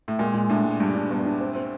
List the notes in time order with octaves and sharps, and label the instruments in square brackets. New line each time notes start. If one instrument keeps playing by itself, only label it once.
[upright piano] A2
[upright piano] A#2 [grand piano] G#3
[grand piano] G#3
[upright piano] A2 [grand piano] D4
[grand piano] G#3
[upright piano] G2 [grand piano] D4
[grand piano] D4
[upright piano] G2 [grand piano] B3
[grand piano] D4
C4
C4